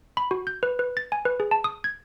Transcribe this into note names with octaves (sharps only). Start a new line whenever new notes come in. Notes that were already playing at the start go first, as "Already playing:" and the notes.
B5
F#4
G6
B4
B4
A6
G#5
B4
G#4
A5
D#6
G#6